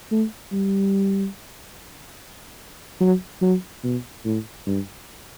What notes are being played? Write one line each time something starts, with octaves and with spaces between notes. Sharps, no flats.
A3
G3
F#3
F#3
B2
A2
G2